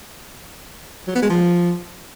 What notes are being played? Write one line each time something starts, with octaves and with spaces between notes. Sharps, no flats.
F#3
B3
G#3
F3